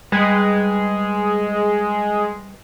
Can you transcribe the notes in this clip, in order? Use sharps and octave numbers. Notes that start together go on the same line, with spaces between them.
G3 G#3 G#4 B4